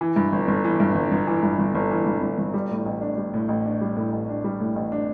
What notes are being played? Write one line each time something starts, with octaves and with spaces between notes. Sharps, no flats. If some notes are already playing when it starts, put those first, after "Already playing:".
E3
G2
G1
G1
E3
G2
G1
G1
E3
G2
G1
G1
E3
G2
G1
G1
G3
A2
A1
D4
G3
A2
A1
D4
G3
A2
A1
D4
G3
A2
A1
D4